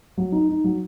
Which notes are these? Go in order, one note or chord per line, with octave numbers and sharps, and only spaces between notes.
F#3
D#4
D#4
F#3